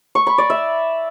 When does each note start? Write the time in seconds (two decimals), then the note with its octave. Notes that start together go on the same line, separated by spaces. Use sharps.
0.15 C#6
0.27 B5
0.38 D5
0.50 E5